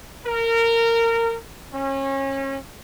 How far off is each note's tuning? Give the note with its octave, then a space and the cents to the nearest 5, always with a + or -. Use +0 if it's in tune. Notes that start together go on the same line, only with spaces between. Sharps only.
A#4 -20
C#4 -30